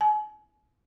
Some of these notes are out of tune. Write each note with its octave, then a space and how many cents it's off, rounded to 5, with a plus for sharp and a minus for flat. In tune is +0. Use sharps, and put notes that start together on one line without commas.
G#5 +35